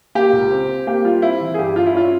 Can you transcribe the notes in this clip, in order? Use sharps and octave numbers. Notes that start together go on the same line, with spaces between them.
A#3 G4
C#2
C4
C4
A#3 G4
G3 F4
C4 E4
E3
G#4
G2 G4
G2 F4
E4
C#4 F4